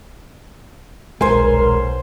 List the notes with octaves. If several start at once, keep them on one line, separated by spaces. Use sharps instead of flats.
D#1 B1 G#3 A#4 C5 G#5